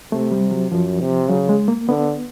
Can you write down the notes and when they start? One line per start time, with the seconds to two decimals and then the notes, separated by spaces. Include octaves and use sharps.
0.12 C3 A3
0.32 G3
0.51 F#3
0.71 F#2 F3
1.00 C3
1.30 C#3 F#3
1.49 G#3
1.68 A#3
1.88 D3 B3